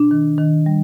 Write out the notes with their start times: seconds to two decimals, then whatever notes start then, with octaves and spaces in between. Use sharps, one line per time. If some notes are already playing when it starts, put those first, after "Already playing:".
Already playing: B2 D4
0.11 D#3
0.38 D#3
0.66 G3